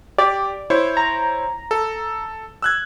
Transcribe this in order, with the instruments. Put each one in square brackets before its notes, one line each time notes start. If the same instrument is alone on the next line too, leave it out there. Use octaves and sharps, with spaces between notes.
[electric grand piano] G4 [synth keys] D5
[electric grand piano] E4 C5 C#5
[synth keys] A#5
[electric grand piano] A4
E6 F#6 G#6